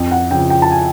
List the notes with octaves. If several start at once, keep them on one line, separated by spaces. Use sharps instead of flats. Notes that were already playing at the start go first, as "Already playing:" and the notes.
Already playing: F2
F#5
C#3 F3 G5
G5
A5
G#5